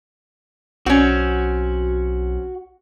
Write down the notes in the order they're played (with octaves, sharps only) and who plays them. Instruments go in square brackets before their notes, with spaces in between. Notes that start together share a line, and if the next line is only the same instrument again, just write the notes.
[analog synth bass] B1 [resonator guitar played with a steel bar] C4 C#4 [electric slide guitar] F#4